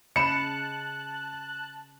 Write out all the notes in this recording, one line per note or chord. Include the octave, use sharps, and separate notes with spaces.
C#3 D#5 A5 B5 F#6 C#7 E7